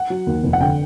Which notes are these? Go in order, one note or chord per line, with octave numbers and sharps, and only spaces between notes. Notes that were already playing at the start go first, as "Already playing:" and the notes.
Already playing: F#5
F#3
D#2
F1
F#5
D3 G5